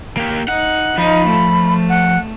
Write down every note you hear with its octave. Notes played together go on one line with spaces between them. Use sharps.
A#3 G4
D#4 F#5
F3 D#4 B5
A3
F#5